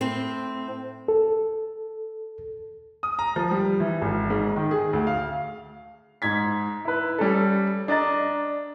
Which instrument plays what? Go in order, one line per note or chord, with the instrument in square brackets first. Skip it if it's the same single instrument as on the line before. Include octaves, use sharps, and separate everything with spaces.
[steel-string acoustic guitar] A2 C4
[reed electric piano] A4
[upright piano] D#6
A#5
F3
G3
E3
G#1
G#2
D#3
G#4
D2
F5
[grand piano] G#2 G#6 B6
E4 B4
G3 C#4 A4
D4 D#5 A#5 A6